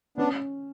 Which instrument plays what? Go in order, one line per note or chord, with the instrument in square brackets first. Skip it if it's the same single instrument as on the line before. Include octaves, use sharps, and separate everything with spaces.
[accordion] B3 D4 [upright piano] C#4